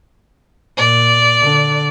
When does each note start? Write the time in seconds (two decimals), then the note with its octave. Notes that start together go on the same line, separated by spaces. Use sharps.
0.77 A#2 D5
1.41 D3